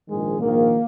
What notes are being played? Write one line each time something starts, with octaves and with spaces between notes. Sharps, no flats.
A#1 G#2 D#3 G#3
A#1 G#2 D#3 A#3